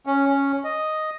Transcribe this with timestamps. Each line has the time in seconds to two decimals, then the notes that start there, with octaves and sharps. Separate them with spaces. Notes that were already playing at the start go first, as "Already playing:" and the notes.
0.06 C#4
0.27 C#4
0.64 D#5